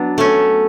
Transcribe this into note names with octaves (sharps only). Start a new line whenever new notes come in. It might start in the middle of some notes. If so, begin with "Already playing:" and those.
Already playing: F#3 B3 D4 B4
A3 C#4